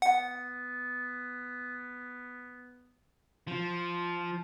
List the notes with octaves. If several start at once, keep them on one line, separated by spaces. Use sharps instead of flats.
B3 F#5
F3